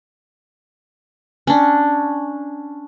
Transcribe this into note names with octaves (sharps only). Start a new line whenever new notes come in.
C#4 D4